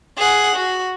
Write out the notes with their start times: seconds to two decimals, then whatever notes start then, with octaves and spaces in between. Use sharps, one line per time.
0.17 G#4 F#5
0.55 F#4